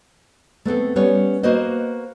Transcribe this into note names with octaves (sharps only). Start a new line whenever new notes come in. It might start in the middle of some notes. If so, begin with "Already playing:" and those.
A3 B3 C4 A4
G3 B3 C#4 C#5
A#3 F#4 B4 C5 D#5